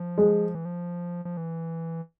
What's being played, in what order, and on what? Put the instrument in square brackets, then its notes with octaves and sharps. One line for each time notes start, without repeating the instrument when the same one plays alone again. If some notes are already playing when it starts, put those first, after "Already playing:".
Already playing: [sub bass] F3
[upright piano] G#3
[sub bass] E3
F3
F3
E3